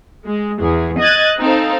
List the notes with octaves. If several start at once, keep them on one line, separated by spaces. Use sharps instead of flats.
G#3
E2 G#4
D#5 F#6 G#6 A6
C4 D#4 A4 C5 F5